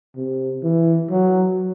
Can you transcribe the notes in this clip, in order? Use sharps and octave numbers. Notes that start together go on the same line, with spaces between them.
C3
E3
F#3